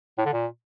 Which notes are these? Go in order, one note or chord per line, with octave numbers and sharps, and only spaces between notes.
A2
D3
A#2